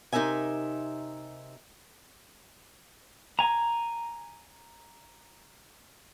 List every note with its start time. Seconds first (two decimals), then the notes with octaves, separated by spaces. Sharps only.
0.12 C3 D#4 G4 A#4 E5 G#5
3.39 G#5 A#5